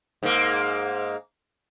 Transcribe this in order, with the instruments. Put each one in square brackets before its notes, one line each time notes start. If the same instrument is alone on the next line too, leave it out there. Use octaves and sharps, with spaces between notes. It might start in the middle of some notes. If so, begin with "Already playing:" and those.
[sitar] G#2 A#3